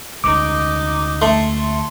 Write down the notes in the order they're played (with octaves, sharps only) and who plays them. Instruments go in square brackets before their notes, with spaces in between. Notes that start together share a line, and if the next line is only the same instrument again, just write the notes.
[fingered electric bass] D2 G#3 [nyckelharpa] D#4 [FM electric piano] D6
[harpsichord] A3 [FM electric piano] C6